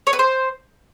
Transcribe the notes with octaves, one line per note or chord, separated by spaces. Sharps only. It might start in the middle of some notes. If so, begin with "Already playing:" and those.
C#5
B4
C5